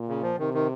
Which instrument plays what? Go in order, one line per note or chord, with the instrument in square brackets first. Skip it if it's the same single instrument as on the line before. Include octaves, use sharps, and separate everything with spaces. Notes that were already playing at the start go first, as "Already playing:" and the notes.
Already playing: [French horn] A#2
[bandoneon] C#3
F3
[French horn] C3 [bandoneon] D#3
[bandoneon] D#3